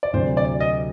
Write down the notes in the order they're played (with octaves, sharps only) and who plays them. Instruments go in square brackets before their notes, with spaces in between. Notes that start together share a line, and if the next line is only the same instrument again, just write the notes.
[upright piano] D5
[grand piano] D2 C3 F#3 C4 [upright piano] C5
[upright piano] D5
D#5